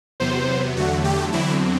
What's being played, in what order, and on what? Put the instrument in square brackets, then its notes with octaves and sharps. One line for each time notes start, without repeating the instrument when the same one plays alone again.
[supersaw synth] E2 C3 F#3 B3 C5
E2 D3 F#3 A3 F#4
G4
E2 D3 F#3 C4 E4